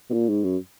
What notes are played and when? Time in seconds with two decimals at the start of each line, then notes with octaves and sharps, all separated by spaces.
0.10 B2
0.13 A#2
0.29 G#2
0.44 F#2